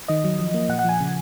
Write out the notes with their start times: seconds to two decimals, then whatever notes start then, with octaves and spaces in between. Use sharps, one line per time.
0.08 D#3 D#5
0.24 F#3
0.39 F3
0.54 A#3
0.69 A#2 F#5
0.79 F#5
0.84 F3 G#5
1.00 C#3